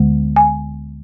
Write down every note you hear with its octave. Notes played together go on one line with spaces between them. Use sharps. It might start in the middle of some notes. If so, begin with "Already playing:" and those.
Already playing: D2 D3 G#3
G#5